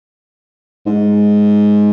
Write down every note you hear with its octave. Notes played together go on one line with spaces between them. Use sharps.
G#2